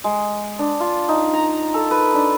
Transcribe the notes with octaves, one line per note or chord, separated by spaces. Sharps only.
G#3
D4
F4
D#4
A#5
A4
B4
D4